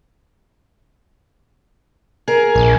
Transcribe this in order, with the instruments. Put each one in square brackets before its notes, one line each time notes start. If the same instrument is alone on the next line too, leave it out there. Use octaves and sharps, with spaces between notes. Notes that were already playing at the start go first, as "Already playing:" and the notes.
[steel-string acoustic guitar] G#4 A#4
[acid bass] A#1